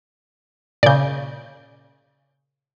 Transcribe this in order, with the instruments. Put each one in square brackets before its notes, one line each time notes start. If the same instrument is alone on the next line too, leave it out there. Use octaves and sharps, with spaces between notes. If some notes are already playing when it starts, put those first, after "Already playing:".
[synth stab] A#2 C#3 [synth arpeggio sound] D5 G6